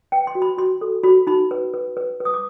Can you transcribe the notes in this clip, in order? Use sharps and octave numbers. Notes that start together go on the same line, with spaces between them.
B4 G5
C6
F#4
B5
F#4 C6
A4
F#4 B5
D#4 B5
B4
B4
B4
B4
D#6
D6